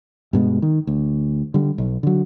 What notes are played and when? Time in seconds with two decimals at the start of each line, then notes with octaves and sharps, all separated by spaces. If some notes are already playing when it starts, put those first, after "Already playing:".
0.33 G2 B2 G#3
0.62 D#3
0.87 D2
1.54 D3 G3
1.78 B1
2.03 D3 F#3